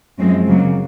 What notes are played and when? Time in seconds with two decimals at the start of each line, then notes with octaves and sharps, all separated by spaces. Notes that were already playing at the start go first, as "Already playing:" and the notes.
0.18 F#2 F3 G#3 C4
0.46 C#3 F#3 A#3